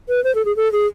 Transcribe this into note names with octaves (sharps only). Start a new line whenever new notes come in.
B4
C5
A4
G#4
A4
G#4